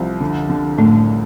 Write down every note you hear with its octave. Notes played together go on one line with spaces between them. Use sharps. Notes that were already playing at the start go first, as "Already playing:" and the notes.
Already playing: C2 F3
D3
D3
F#1 A2 A3